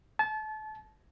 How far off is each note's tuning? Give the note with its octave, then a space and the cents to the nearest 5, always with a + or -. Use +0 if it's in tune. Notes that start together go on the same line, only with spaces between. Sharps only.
A5 -30